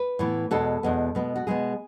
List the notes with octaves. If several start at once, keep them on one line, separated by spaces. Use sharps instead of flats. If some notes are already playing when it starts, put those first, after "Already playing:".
Already playing: B4
A2 E3 B3
E2 B2 G#3 B3 A4
E2 B2 G#3 B3
B2 G#3 B3
F#4
B2 G#3 B3 G#4